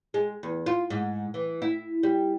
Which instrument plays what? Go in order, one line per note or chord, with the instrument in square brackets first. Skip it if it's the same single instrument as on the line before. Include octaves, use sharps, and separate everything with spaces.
[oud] G#3
E2
F4
G#2
E3
E4
G3